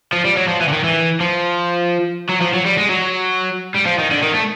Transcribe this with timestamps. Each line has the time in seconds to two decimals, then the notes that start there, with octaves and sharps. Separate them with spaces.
0.12 F3
0.24 G3
0.37 F#3
0.48 F3
0.61 E3
0.68 D3
0.72 D#3
0.84 E3
1.21 F3
2.30 F#3
2.41 F3
2.54 F#3
2.66 G3
2.78 G#3
2.89 F#3
3.74 G3
3.86 F3
3.98 D#3
4.11 D3
4.22 D#3
4.34 A3